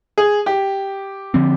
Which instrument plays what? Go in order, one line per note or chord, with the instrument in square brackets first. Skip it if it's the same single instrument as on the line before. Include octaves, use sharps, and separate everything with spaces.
[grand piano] G#4
G4
[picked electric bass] D3 F3 C4